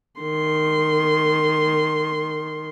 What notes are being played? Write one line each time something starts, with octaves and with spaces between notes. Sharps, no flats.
D#3 C6